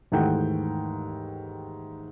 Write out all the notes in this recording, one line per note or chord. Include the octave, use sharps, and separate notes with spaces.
D#2 G#2 E3 A3 F#5 G5